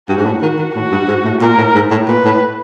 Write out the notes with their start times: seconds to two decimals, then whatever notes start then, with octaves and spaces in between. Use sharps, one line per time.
0.09 G2 F#4
0.17 G#2
0.26 A2
0.42 D#3 F#4
0.58 D#3
0.76 A2 F#4
0.91 G2
1.08 G#2
1.24 A2
1.41 A#2 A#4
1.58 A2
1.75 G#2
1.91 A2
2.07 A#2 B4
2.25 A2